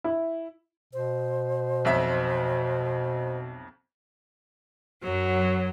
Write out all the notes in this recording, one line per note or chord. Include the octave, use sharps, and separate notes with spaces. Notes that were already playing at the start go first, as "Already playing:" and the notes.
E4
B2 C5
B1 F2 E5
F#2 F#3